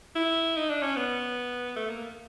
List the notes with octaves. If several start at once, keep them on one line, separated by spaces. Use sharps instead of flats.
E4
D#4
D4
C#4
B3
A3
A#3